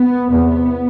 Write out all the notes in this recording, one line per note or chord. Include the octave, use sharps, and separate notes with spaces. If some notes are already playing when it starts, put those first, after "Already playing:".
Already playing: B3
E2 C3 B3